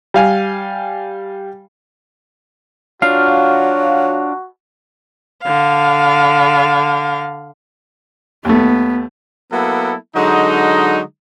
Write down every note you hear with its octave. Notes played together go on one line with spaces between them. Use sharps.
G3 F5 G#5
F#3 D4 F4 F#4 F5
D3 F5
D#2 A3 B3
F#3 A#3 B3 E4 A4
D3 F#3 G#3 D#4